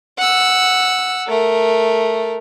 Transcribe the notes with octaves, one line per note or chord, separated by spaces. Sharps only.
F#5 E6
A3 A#4